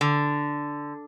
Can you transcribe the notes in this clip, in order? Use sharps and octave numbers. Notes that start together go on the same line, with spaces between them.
D3